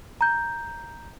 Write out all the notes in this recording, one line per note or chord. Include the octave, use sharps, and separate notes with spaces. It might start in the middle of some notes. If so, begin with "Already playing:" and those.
A#5 G6